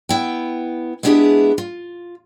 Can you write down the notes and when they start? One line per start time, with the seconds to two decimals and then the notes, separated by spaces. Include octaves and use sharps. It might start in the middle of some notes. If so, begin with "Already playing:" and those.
0.09 B3 E4 G5
1.03 G#3 B3 D4 E4 G4 G#4
1.58 F4